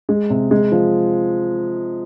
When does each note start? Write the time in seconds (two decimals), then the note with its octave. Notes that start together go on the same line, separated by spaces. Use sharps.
0.09 G#3
0.30 C3
0.51 G#3
0.72 F3